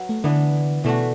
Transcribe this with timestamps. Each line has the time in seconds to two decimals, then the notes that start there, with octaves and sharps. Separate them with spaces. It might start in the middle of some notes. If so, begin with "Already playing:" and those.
Already playing: F#3 F#4 B4
0.09 A3
0.24 D3 E3 B3 D4
0.84 B2 E3 A3 D4 F#4